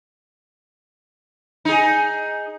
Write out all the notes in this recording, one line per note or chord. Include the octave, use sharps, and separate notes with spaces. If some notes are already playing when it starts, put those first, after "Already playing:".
D#4 G#4